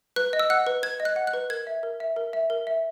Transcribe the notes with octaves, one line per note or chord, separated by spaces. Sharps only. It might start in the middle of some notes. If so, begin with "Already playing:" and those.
B4 F#6
D#5
E6
F#5 F#6
B4
B4 G#6
D#5
F#6
F#5
F#6
B4
A#4 G#6
E5
A#4
E5
A#4
E5
A#4
E5